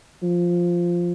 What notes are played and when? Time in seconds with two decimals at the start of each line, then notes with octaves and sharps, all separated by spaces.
0.23 F3